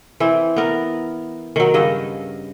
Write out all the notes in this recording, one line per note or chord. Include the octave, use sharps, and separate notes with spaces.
E3 C4
B3 A#4
D#3 F#3
G2 C#3 D#5